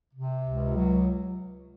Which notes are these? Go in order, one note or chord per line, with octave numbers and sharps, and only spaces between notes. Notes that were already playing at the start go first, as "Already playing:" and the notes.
C3
C#2
F#3